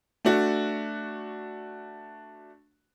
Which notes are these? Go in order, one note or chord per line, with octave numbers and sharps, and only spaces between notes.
A3 D4 F#4